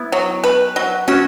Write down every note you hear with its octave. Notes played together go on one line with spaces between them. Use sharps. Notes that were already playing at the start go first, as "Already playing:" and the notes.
Already playing: B3 E4
F#3
B4
F#3
F#3 C#4 F#4